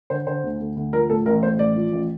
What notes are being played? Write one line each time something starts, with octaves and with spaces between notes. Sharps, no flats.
D3 C5
D3 C5
D2
D2
D2
F3 A#4
A2 A4
A1 A#4
A2 C5
A1 D5
F3
A1